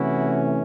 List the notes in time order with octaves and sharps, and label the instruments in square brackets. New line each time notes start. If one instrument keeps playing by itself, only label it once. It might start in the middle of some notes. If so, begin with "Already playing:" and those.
Already playing: [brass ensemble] C3 E3 A3 C#4 E4 F#4